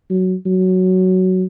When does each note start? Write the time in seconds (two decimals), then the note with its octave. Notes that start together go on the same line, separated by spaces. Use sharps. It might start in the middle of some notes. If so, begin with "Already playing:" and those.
0.10 F#3
0.46 F#3